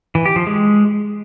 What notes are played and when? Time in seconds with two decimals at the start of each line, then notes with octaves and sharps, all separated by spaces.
0.15 E3
0.26 G4
0.36 F3
0.47 G#3